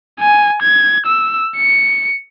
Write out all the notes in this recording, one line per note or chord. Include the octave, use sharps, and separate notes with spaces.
G#5
G#6
E6
C#7